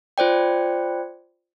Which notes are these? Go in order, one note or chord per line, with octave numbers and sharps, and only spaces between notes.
F4 C5 D5 G5